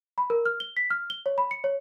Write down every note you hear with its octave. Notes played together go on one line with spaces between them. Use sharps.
B5
A#4
F6
G7
B6
F6
G7
C#5
B5
C#7
C#5